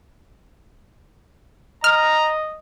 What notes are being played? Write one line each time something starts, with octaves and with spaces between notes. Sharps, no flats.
D#5 A#5 F6